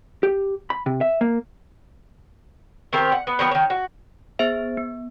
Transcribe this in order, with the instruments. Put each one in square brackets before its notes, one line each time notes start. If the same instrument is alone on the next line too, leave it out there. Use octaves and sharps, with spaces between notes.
[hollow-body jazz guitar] G4
B5
C3
E5
A#3
[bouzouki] D#3 C4 G4 A#4
F#5
B3
D#3 F#3 B3 A#4
D#3 C#5
F#4
[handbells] B3 G#4 C5 E5
B3